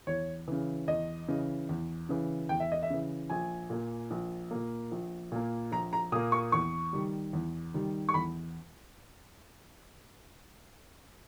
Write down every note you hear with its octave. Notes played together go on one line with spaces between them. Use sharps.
E2 C#5
C#3 E3
E2 D#5
C#3 E3
E2
C#3 E3
E2 G5
E5
D#5
E5
C#3 E3
A#1 G#5
A#2 A#3
A#1
A#2 A#3
A#1
A#2 A#3
A#1 A#5
A#5
A#2 A#3 D#6
C#6
E2 C#6
D#3 G3
E2
D#3 G3
C#6
E2 B5